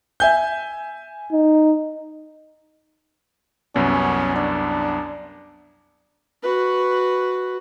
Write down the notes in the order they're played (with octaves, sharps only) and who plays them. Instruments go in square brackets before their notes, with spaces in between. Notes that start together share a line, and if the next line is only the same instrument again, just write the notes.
[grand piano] E5 G#5 G6
[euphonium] D#4
[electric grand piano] C2 F#2 B3 [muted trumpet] C#4
[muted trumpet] D4
[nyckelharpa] F#4 B4